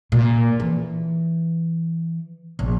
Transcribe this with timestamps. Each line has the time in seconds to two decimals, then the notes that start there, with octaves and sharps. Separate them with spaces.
0.12 A#2
0.60 E3
2.59 A#1